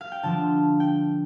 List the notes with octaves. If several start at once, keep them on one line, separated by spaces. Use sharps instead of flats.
F5
G5
D3 F3 C4 A5
G5